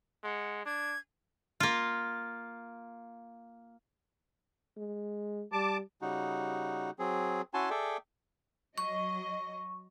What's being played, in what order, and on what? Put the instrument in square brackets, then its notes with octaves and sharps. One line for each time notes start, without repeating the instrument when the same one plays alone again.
[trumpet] G#3 [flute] F#5
[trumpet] D4 [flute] G#6
[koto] A#3 F4
[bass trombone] G#3
[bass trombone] G3 [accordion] A5 D6
[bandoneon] C#3 G3 D#4 F#4
F#3 C4 G#4
C#4 E4 F#4 G#5 A5 C6
G#4 A4 D5 E5 G5
[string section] F#3 D#5 [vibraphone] C#6